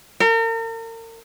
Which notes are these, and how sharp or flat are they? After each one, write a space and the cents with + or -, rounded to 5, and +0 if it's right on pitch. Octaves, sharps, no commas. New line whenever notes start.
A#4 -40